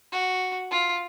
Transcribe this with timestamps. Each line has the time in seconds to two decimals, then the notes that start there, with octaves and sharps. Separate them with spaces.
0.12 F#4
0.71 F4